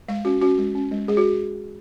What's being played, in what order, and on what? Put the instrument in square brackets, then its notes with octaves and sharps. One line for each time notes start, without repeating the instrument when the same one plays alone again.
[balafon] G#3 F5
C#4 F#4
C#4 F#4
G#3
C#4
G#3
G#3 G#4
F#4